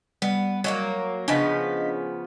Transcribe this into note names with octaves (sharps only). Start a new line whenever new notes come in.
G3 B3
F#3 A3 A#3
C#3 F3 B3 D4 D#5 B6